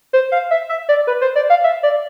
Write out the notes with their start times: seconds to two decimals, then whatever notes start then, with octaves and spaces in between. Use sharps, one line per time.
0.13 C5
0.32 F5
0.51 E5
0.69 E5
0.89 D5
1.07 B4
1.21 C5
1.36 D5
1.50 F5
1.64 E5
1.83 D5